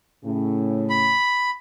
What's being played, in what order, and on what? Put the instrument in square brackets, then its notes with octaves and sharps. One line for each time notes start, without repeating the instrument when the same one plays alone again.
[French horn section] A2 C#3
[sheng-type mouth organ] B5